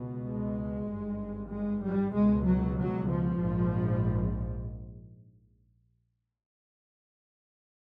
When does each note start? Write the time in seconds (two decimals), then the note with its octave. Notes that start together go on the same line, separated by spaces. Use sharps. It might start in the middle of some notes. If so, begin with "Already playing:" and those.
Already playing: C#2 B2
0.26 G#3
0.88 G#1 G2
1.50 G#3
1.83 G3
2.13 C#2 B2 G#3
2.45 F#3
2.76 F#3
3.07 F3
3.38 A#1 G#2